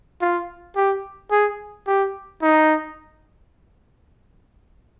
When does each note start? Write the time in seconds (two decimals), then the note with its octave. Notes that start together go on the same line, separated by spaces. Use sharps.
0.21 F4
0.76 G4
1.31 G#4
1.87 G4
2.42 D#4